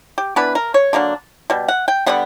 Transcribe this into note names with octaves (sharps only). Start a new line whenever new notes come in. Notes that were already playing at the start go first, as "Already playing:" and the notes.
G4
E3 B3 D4 B4
A#4
C#5
D3 F#3 A#3 D4
B2 G3
F#5
G5
D3 G3 B3 F#5